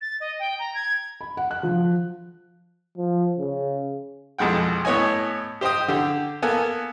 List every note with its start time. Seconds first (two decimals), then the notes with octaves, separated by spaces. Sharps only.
0.01 A6
0.20 D#5
0.39 G5
0.59 A#5
0.74 G#6
1.21 B5
1.37 F#5
1.51 F#6
1.63 F3
2.98 F3
3.38 C#3
4.38 C2 F2 B2 G#3 F#5 G5
4.85 A2 B3 C#5 D#5 G#5
5.61 G4 C5 D#5 G5 D#6
5.88 D3 G4
6.42 A#3 B3 A4 G#5